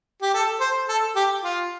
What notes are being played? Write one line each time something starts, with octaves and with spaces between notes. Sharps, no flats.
G4
A4
C5
A4
G4
F4